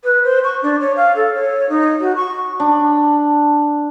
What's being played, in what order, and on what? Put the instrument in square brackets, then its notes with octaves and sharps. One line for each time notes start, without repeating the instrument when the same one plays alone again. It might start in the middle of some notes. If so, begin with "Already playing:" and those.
[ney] B4
C5
C#6
D4
C#5
F5
A4
C#5
D#4
F#4
C#6
[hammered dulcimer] D4